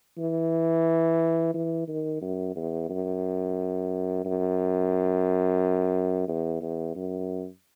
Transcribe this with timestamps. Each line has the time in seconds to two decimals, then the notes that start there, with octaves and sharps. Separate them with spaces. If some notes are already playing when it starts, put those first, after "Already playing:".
0.18 E3
1.54 E3
1.88 D#3
2.21 F#2
2.56 E2
2.90 F#2
4.25 F#2
6.28 E2
6.61 E2
6.95 F#2